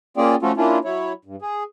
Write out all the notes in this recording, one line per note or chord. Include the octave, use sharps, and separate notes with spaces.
A#3 C#4 F4 G#4 D5 G5
F3 A3 C#4 F4 F#4 A4
A#3 C#4 D4 E4 F4
F#3 E4 C#5
G2
G#4